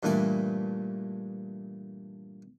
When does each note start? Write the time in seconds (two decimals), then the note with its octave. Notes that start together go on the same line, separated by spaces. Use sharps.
0.03 G2 A#2 E3 A3 D5